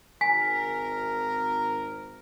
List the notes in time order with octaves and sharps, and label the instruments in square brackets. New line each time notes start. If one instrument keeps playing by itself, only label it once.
[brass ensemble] G#1 A#4 [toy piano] G#5 [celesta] B6